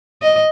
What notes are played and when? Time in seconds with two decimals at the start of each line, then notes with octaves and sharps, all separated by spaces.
0.22 D#5